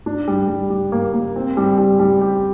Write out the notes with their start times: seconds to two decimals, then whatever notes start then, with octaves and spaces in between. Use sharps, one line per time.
0.06 D4
0.28 G3
0.48 G3
0.70 G3
0.92 A#3
1.13 A#3
1.36 C4
1.57 G3
1.78 G3
1.99 G3
2.21 G4